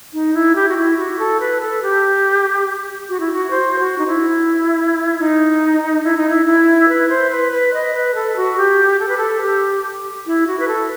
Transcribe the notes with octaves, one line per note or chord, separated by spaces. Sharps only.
D#4
E4
G4
F#4
E4
F#4
A4
B4
A4
G4
F#4
E4
F#4
C5
F#4
D#4
E4
D#4
E4
D#4
E4
E4
B4
C5
B4
B4
D#5
B4
A4
F#4
G4
A4
B4
A4
G4
E4
F#4
B4
A4